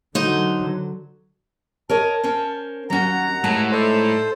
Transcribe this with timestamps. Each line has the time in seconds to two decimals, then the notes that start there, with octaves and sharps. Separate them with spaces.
0.15 D3 F#3 D#4 C5
1.90 A#4 C#5 D#5 A5
2.24 C#4 A#4 C5
2.90 D#2 F#3 C#4 F#5 A#5
3.44 A2 G#3 A5
3.72 D#4 A4 C5 D5 E5